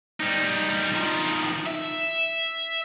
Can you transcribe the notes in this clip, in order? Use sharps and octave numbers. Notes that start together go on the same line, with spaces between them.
G3 D#4
D#3 F3
E5